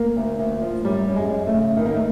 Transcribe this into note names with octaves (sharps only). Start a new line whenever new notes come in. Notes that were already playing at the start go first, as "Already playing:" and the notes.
Already playing: A#3
D2
D2
F3
F#2 G3
F#2
G#3
F#2
A3
C#3
D#3 B3
A#3
A3